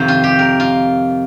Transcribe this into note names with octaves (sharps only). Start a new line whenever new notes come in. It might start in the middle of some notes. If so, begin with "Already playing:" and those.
Already playing: F2 C3 D#3 C5 F5
F4
G4
A#4
F4